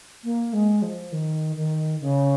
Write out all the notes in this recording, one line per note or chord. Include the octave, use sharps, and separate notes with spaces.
A#3
G#3
F3
D#3
D#3
C#3